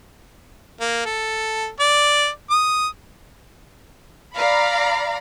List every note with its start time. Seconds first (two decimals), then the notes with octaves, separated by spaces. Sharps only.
0.80 A#3
1.06 A4
1.80 D5
2.50 D#6
4.35 D5 F5 A#5 B5